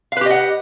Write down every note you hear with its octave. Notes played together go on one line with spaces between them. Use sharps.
G4 B4 D#5 F5 F#5